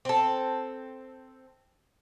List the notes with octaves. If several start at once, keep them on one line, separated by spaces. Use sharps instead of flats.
C4 A4